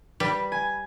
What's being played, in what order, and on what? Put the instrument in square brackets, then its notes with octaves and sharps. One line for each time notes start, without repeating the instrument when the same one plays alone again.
[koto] G3 [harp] B4
[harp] G#5